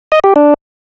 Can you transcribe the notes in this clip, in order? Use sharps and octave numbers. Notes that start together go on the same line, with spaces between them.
D#5
G4
D4